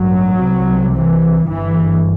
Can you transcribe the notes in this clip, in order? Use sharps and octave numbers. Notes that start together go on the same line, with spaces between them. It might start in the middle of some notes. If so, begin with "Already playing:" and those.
Already playing: A1 G2 F#3
C2 C3
E3
G1 G2 E3